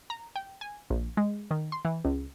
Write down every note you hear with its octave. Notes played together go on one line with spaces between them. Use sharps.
A#5
G5
G#5
A#1
G#3
D#3
C6
E3
C#2